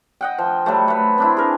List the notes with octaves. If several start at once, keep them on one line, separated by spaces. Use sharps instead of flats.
D#5 F#5 G5
F3
F#3 G3 A3
A3 B4
C4 D4 E4
G#4 A#4